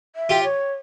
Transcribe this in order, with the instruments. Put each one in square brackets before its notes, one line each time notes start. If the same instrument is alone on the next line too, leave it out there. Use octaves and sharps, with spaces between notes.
[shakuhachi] E5
[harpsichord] F4 G4
[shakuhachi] C#5